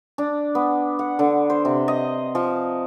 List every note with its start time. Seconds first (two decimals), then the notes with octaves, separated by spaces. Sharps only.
0.18 D4
0.55 B3
0.99 F#5
1.19 D3
1.50 C5
1.65 C3
1.88 D#5
2.35 F3